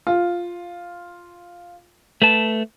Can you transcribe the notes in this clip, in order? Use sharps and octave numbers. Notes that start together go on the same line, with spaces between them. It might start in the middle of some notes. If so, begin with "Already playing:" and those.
F4
A3 B4 A5